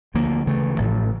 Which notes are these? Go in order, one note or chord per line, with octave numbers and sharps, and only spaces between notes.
D2 D3 F3 A#3
D2 C#3 E3 A3
A1 A2 F3